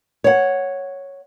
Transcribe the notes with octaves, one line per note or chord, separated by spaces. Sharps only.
C#5 F#5